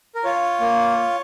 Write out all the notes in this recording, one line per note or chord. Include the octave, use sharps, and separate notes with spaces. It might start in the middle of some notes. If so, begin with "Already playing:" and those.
A#4
F4 C#5
A#3